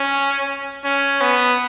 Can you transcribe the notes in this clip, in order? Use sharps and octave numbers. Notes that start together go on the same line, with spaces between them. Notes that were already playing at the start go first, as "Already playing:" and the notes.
Already playing: C#4
C#4
B3